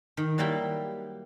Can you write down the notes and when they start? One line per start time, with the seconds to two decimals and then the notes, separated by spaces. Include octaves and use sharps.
0.17 D#3
0.38 F#3 G3 A#3 E4 G4